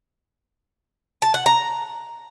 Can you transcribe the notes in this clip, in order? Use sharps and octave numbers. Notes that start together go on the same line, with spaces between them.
A5
F#5
A#5